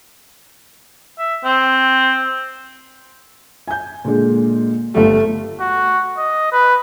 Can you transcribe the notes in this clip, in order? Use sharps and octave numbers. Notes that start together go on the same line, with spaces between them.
E5
C4
G#5 G6
A#2 D3 G#3
G1 G3 A3
F#4
D#5
B4